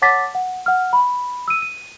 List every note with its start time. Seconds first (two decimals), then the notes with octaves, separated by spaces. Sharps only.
0.02 C#5 F#5 A5 D6 A6 B6
0.35 F#5
0.66 F#5 F6
0.93 B5
1.48 E6 D#7
1.62 D#7